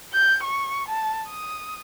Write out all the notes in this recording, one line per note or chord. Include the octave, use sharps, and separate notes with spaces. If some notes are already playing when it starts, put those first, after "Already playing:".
G6
C#6
A5
D#6